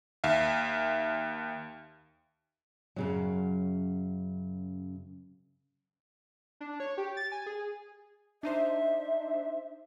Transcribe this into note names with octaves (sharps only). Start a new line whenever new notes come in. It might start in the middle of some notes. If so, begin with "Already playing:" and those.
D#2 E5 F5
F#2 C#3 F#3
D4
C#5
G4
A6
G#5
G#4
D4 D#4 C5 E5